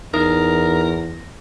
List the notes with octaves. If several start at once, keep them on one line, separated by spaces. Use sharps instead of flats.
E2 D#4 A#4 E5 D#6
A#6